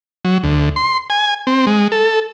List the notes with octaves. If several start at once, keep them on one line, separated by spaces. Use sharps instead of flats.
F#3
D2
C6
G#5
C4
G#3
A4